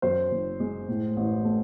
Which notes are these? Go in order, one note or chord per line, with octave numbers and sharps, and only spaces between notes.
F#2 C5
F#1
G#3
A2
A1
A3